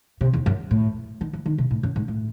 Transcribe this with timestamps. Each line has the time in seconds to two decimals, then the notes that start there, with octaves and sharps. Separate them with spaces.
0.21 C3
0.33 E2
0.46 F#2
0.71 A2
1.21 D#3
1.33 E3
1.46 D#3
1.58 C3
1.71 A2
1.83 F#2
1.96 G#2
2.08 A2